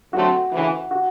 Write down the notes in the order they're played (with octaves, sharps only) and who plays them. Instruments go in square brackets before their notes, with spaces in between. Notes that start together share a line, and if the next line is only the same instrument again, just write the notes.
[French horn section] D3 F#3 A3 C4 [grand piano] F#4
[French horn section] D2 C#3 E3
[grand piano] F#4